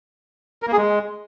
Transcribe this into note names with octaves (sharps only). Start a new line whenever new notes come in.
A#4
A#3
G#4
G#3